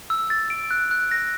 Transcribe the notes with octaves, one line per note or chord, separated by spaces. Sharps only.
E6
A6
D7
F#6
F#6
A#6